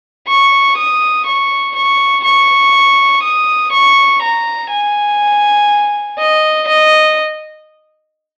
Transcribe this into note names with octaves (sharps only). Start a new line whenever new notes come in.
C#6
D#6
C#6
C#6
C#6
D#6
C#6
A#5
G#5
D#5
D#5